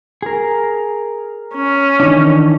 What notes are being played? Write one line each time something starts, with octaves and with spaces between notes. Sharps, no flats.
G#4 A#4
C#4
D#3 E3 D4